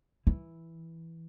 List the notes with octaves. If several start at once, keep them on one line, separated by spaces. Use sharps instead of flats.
E3